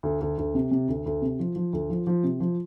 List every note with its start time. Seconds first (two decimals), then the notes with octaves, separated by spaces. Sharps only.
0.03 D2
0.21 D2
0.38 D2
0.54 C3
0.71 C3
0.88 D2
1.06 D2
1.22 C3
1.39 F3
1.56 F3
1.73 D2
1.90 F3
2.07 F3
2.23 C3
2.40 F3